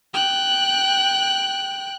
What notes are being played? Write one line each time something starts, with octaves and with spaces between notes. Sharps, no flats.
G5 F#6